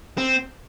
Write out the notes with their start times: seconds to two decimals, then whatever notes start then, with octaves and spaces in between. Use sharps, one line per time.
0.18 C4